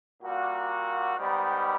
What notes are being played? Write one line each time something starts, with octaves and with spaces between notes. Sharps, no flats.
A#2 G3 A#3 F#4
G#2 D#3 G3 B3